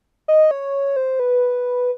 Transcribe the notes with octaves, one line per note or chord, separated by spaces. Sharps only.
D#5
C#5
C5
B4